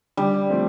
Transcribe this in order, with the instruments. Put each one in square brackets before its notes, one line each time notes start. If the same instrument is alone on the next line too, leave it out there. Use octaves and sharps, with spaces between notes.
[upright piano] D3 [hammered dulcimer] G3
[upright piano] F3 A3 C4